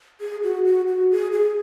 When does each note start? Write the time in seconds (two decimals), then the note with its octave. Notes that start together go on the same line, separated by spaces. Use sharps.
0.21 G#4
0.43 F#4
0.66 F#4
0.88 F#4
1.11 G#4
1.33 G#4